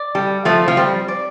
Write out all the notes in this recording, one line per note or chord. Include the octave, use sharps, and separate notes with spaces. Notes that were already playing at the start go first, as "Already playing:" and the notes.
Already playing: D5
G3 A4
F3 A3 C4
F3
G3 C4
D5